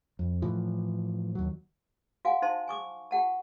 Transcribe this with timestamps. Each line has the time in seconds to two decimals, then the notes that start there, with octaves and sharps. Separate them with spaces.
0.19 F2
0.42 A2 E3 F3
1.35 D#2 F#3
2.25 F#4 F5 F#5 G#5
2.42 D#4 E4 C5 F5 A5 C6
2.68 G#5 C#6 D6
3.11 F4 G4 F#5 A5